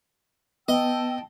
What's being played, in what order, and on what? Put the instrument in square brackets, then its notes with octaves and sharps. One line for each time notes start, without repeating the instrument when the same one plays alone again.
[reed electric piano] B3 [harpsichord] D#5 [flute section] G5 A5 E6